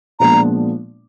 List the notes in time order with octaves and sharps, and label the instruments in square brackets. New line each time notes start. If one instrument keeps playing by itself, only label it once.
[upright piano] A#2 F3 G#3 B3 D4 [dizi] A#5